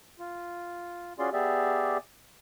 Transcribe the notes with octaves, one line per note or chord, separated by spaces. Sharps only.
F4
C#4 F4 F#4 G#4 D5 C6
B3 G4 G#4 D5 E5